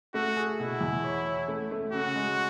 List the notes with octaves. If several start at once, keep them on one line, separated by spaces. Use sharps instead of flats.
A3 F#4
G#4
B2 E4
E2
C#5
C#5
A3
A3
C#3 F#4
G#3